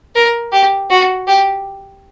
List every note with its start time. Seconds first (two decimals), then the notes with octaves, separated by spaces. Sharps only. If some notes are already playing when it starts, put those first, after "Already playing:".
0.15 A#4
0.52 G4
0.90 F#4
1.27 G4